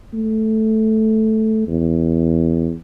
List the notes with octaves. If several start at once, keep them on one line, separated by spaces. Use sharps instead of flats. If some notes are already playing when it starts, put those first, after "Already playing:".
A3
E2